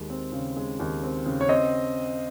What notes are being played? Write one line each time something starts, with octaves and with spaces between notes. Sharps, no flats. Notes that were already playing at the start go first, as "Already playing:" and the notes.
Already playing: D#2 G#3
C4
C#3
G#3
D#2
C4
C#3
C#5
C4 D#5